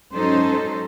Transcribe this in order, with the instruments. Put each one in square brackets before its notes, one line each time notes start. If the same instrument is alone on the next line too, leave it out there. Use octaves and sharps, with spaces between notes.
[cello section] G#2 F#3 C#4 D#4 A4 C5